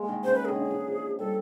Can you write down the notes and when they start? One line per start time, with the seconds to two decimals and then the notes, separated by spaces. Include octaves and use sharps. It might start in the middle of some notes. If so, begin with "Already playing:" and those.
Already playing: G#3 A#3
0.09 D#3
0.24 C#3 C5
0.34 B4
0.45 D#3 G#4
0.56 D3
0.71 E3
0.87 F3
1.19 G3 A4